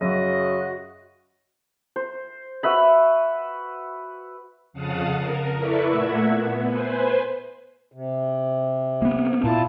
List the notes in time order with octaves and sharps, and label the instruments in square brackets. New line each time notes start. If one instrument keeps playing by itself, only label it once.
[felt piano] F#2 [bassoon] C#3 [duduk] F#4 [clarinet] D#5
[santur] C5
F#4 B4 E5 B5
[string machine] F2 C#3 F5 F#5 A5 D#6
A#4
E4 A4 B4 D5 E5 C#6
A#2 A3 A#3 E5 F#5 G#6
B3
B4 C5 G#5
[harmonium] C3
[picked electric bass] A#3 B3
[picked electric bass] A#2 [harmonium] E4 F4 A5